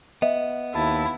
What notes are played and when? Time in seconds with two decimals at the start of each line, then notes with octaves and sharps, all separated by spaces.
0.22 B3 D#5 E5
0.75 D#2 E4 A5